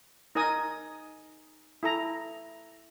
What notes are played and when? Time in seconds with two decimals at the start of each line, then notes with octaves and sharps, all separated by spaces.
0.35 D#4 A#4 D#5 G#5 D#6
1.83 E4 A4 A#5